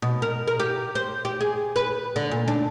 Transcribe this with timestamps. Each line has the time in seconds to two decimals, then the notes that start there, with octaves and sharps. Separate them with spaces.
0.02 B2
0.22 A#4
0.48 A#4
0.60 G4
0.95 C5
1.25 G4
1.41 G#4
1.76 B4
2.16 D3
2.31 A#2
2.48 D4